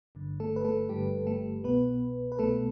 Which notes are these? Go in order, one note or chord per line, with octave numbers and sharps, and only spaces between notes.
G1 G2 D3
A3 A4
B4
A3 A4
G1 G2 D3 G3 G4
A3 A4
C2 B2 B3 B4
B4
C2 B2 A3 A4